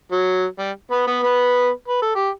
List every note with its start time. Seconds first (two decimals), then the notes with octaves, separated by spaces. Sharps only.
0.12 F#3
0.59 G3
0.91 B3 B4
1.07 B3 B4
1.23 B3 B4
1.88 B4
2.02 A4
2.15 G4